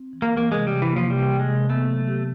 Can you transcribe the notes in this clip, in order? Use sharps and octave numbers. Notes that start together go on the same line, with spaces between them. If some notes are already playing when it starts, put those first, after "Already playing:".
Already playing: C4
E3
A#3
E3 A#3
C3 G#3
C3 G3
E3
A#3
F3
C3 G3
C3
G#3
C3
A3 B3
F#3
G4